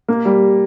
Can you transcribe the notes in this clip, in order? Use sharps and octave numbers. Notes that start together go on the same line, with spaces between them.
A#3
G3